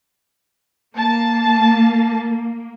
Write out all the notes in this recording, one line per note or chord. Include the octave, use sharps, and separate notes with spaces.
A#3 A5